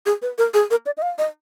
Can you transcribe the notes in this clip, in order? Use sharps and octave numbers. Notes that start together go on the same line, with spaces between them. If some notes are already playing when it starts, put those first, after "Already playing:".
G#4
B4
A#4
G#4
A#4
D5
D#5
F5
D#5